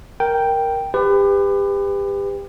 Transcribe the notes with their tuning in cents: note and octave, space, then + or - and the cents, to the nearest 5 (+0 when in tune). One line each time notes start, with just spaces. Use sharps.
A#4 +0 G5 +0
G4 +30 B4 +25